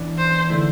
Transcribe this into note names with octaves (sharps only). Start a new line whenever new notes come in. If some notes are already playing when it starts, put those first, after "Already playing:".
Already playing: E3 B3 D4
C5
D3 A3 E4